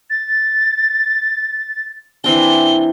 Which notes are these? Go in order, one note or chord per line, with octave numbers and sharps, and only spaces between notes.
A6
E3 C4 D4 G7